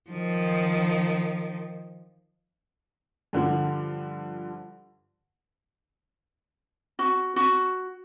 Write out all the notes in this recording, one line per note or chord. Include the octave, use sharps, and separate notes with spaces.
D#3 F3
G2 D3 F3
F#4
F#4